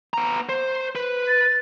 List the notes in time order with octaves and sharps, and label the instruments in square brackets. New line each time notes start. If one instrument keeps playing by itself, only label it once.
[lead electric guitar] B3 A#5
C5
B4
[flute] A6